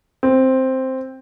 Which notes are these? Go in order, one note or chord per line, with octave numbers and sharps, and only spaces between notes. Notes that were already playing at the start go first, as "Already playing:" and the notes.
C4